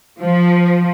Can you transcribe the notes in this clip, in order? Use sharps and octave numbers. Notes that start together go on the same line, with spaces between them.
F3